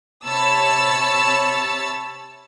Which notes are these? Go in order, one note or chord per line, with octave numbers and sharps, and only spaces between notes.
C3 C#5 A5 B5 E6 A6